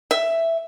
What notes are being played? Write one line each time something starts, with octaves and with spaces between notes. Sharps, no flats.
E5